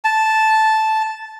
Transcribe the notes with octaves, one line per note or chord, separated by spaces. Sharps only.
A5